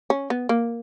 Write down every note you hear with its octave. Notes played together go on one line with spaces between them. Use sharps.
C#4
B3
A#3